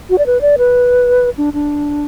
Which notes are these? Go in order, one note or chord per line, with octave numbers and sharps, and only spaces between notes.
F#4
D5
B4
D5
B4
D4
D4